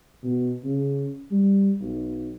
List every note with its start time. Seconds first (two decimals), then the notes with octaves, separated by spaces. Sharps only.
0.23 B2
0.64 C#3
1.31 G3
1.81 B1